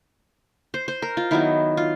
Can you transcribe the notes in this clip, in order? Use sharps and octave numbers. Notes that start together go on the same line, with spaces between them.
C5
C5
A#4
F4
D#3 F#3 B3 E4
F4